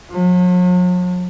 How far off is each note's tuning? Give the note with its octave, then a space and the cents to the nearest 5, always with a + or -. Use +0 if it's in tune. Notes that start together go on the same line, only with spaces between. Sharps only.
F#3 -45